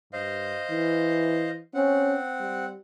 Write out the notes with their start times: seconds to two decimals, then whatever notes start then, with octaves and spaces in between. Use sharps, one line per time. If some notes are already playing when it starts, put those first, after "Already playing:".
0.13 G2 C5 D#5 F5
0.70 E3
1.74 C4 C#4 F#5
2.41 G3